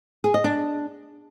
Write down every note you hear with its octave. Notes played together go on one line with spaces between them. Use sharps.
G#4
D#5
D4